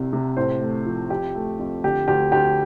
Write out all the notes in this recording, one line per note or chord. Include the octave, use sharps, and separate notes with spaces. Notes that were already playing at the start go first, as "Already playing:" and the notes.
Already playing: C2 C3
C3
A2 C5
A3
F3
F2 G4
A3
F2
D3 G4
D2 G4
D2 G4